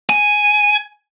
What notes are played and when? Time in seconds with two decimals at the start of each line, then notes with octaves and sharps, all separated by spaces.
0.10 G#5